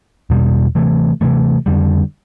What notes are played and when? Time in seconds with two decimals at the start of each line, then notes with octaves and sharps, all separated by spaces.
0.30 E2 B2 G3
0.75 C3 E3 A3
1.21 C3 E3 A3
1.66 F2 D3 G3